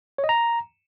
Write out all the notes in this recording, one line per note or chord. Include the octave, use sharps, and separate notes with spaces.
C#5
D#5
A#5